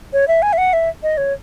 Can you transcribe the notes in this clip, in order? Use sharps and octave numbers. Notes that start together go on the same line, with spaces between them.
C#5
E5
G#5
E5
F#5
E5
D#5
C#5